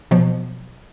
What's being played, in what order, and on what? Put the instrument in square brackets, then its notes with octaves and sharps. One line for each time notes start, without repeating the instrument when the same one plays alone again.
[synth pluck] B2 F3 F#3 B3